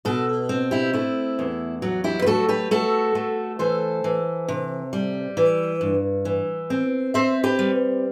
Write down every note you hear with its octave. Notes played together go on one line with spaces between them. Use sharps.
B2 F#4 A4
C4
E4 G4
A3 E4
E2
F#3 F#4
E4 G4
B4
A3 F#4 A4
G4 B4
A3 F#4 A4
A3
E3 A4 C5
E3
C3
G3
E3
G2
E3
C4
C4 C5 E5
G4 B4
G3